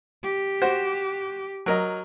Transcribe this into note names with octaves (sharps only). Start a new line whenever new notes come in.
G4
F#4 C5
F#3 A#4 D#5